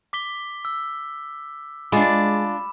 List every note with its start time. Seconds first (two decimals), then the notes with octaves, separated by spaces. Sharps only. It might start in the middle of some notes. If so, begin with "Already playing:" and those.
0.13 D6 B6 G7
0.65 E6
1.92 G#3 D4 F4 B5 D6 E7